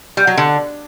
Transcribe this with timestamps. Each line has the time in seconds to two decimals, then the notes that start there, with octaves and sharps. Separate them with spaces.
0.17 G3
0.27 F#3
0.37 D3